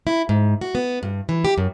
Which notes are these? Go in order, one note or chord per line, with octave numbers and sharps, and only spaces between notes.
E4
G#2
F#4
B3
G2
E3
G4
F#2